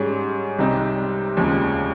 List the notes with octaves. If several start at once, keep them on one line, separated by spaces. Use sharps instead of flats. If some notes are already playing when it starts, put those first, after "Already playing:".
Already playing: G#2 G3 C#4 G#4 C#5
C2 C3 G3 C4 D#4
F1 D#2 C#3 F3 G#3